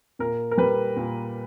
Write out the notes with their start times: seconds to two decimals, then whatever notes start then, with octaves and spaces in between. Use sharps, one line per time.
0.19 A#2 A#4
0.51 A#4
0.58 G3 B4
0.97 A#2